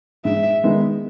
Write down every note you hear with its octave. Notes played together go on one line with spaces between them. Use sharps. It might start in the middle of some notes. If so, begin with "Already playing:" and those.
G#2 E5
D#3 G#3 B3 D#4